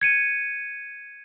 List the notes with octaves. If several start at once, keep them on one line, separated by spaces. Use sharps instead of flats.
G#6 C#7 D#7